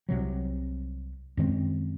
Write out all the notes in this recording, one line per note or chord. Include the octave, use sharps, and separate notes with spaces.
C2 C3 F#3
F#2 D#3 G#3 C4